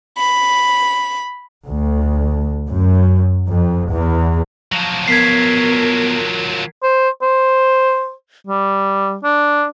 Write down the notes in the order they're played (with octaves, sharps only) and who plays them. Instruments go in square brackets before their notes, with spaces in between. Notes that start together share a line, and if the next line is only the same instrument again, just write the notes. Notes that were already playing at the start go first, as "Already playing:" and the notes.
[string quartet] B5
[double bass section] D2
F#2
F2
E2
[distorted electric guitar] F3 F#3
[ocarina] B3 [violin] A#4 [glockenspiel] G#6 B6 C7
[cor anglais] C5
C5
G3
D4